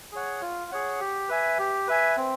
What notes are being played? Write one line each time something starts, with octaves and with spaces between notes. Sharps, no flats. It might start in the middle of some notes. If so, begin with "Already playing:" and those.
G#4 C#5 F#5
F4
G#4 C#5 F#5
G4
B4 E5 G#5
G4
B4 E5 G#5
C4